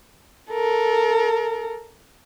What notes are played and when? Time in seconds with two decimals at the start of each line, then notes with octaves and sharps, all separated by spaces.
0.52 A4 A#4